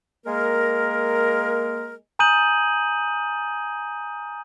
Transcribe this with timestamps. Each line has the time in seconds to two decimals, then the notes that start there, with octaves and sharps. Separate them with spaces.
0.25 G#3 A#3 A#4
2.19 G#5 A#5 D#6 G6 D#7 F#7